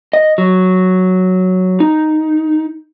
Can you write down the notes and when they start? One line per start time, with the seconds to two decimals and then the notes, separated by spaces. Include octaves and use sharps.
0.13 D#5
0.38 F#3
1.80 D#4